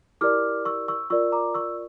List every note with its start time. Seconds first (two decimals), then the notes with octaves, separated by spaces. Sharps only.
0.21 E4 G4 A#4 D5 D6 F6
0.65 C#6 E6
0.88 C#6 E6
1.10 F4 A#4 D5 C#6 E6
1.32 A#5 D6
1.54 C#6 E6